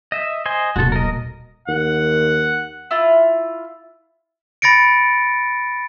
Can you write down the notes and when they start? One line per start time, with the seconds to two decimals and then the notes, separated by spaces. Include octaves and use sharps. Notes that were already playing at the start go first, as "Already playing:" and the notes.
0.12 D#5 E5
0.46 C5 D#5 G#5
0.76 D#1 B1 F#4 A4
0.92 A#4 D#5
1.68 D#2 F#5
2.91 E4 F4
4.62 B5 A6 A#6 C#7 D7